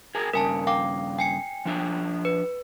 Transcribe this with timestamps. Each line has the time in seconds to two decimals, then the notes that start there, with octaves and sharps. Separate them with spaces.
0.15 G#4 A#4 G#5
0.33 G2 C#3 A#4 G#5 A5
0.67 F5 G5 D6
1.18 G5 G#5 C#7
1.65 F3 D4 E5
2.25 B4